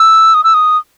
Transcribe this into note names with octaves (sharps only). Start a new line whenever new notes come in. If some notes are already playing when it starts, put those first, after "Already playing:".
Already playing: E6
D#6
E6
D#6